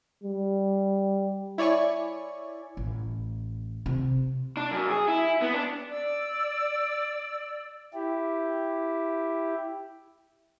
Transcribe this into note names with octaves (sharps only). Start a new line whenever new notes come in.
G3
E4 C#5 D5 G#5 C#6
A1
C3
D4
F#2
G#4
E4
B3
D4
D5 E6
E4 G4